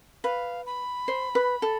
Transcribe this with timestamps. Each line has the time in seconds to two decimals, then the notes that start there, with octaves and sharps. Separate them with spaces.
0.24 B4 F5
0.66 B5
1.08 C5
1.35 B4
1.62 A4